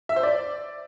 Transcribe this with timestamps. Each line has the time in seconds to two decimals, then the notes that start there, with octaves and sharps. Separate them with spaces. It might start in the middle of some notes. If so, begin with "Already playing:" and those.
0.09 E5
0.16 C5
0.23 D5